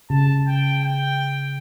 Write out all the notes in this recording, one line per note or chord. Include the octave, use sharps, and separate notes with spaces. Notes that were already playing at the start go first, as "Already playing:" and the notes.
C#3 A5
G5
G5